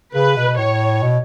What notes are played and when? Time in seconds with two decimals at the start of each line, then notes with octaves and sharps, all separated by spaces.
0.15 C#3 B4
0.36 B2
0.58 A2 C#5
1.03 B2